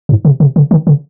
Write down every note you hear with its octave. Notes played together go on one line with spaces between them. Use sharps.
G#2
C3
C3
C#3
D#3
C#3